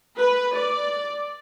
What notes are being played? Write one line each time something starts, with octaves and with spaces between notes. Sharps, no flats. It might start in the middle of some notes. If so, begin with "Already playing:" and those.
B4
D5